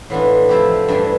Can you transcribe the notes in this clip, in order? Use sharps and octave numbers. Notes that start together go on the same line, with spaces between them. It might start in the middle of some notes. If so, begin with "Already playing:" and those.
A2 E3 B3 D4 F4
C3 F3 A3 E4 G4
G2 E3 G3 D4